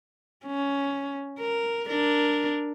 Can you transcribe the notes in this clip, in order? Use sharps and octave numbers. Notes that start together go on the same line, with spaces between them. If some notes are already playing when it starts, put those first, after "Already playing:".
C#4
A#4
D4 A#4